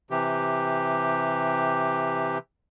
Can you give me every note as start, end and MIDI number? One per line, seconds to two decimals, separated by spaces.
0.10 2.38 48
0.10 2.38 52
0.10 2.38 67